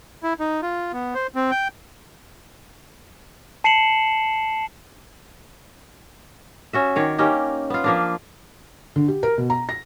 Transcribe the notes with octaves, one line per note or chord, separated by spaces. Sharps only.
E4
D#4
F4
B3
C5
C4
G5
A5 C7 C#7 E7 F#7
C#4 F#4 E5
D#3 C#5 D5
A#3 C#4 D#4 G4
B3 F4
F3 A#3 D4
D3
G4
A#4
B2
A#5
A#6